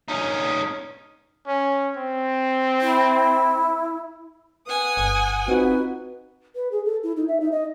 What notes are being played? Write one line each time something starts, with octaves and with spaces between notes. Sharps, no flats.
C#4 D#4
C#4
C4
E4
B4 F#5 G#5 D#6
G1
C4 D#4 F4 F#4 B4
B4
G#4
A4
E4
D#4
E5
D#4
D#5